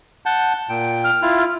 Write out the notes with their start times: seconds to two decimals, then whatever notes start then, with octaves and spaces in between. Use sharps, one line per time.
0.26 F#5 A5 G6
0.69 A#2 G5
1.04 F6
1.22 E4 F4